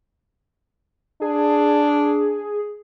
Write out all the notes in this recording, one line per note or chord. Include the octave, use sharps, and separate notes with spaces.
D4 G#4